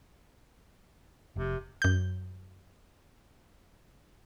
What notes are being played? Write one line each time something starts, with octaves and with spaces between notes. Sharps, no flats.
F1 C3
F#2 G6